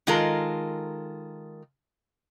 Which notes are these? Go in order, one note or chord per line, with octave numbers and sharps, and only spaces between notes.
D#3 G#3 F4 A4 A#4